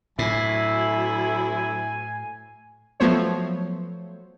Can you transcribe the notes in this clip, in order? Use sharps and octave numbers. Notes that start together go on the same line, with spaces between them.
D2 A2 F#3 E4 G#5
F3 F#3 A3 B3 C5 C#5